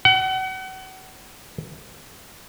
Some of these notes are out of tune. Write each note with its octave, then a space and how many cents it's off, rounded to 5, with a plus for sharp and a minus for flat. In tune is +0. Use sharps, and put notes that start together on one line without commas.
F#5 +35